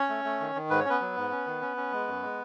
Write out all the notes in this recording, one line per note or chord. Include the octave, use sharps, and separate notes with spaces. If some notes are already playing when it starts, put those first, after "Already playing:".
Already playing: C#4 C#5
A3
A3
D#3
D#3
G#2 B4
C#5
B3 C#4 B4
F#3
G#2
C#4
D#3
C#4
C#4
G#3
F#2
G#3